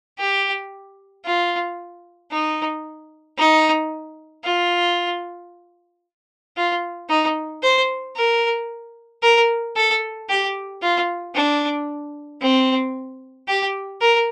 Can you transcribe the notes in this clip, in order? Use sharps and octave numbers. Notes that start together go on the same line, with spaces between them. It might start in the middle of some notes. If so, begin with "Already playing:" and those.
G4
F4
D#4
D#4
F4
F4
D#4
C5
A#4
A#4
A4
G4
F4
D4
C4
G4
A#4